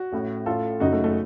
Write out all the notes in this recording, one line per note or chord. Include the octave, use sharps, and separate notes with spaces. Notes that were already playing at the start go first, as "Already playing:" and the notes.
Already playing: F#4
A1 A2
A1 A2 F4 A4
F#1 F#2 C#3 D#4 F#4
A3
A3